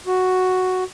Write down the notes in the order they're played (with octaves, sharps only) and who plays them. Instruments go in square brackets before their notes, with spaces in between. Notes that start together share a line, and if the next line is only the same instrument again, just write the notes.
[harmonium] F#4